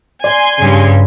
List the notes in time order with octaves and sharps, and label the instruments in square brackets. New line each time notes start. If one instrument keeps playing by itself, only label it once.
[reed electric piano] D5 [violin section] G#5 C6
[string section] G2 [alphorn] C#3